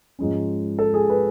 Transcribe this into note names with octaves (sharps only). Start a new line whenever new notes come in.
G#2 F3 G#3 C#4
A4
G#4
B4